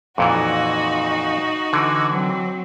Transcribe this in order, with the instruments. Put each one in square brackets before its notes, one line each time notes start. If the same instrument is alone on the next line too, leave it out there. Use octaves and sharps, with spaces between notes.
[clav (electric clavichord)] F2 A#2 E3 [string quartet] D#4 F#4
[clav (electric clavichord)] D3 E3
[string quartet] F#3 C4